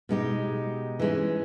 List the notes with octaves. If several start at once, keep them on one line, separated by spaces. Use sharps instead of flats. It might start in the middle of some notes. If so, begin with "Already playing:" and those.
B2 G#3 D#4 G4
E3 G#3 C#4